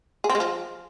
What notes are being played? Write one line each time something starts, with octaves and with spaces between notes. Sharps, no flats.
G#4
C4
G#3
F3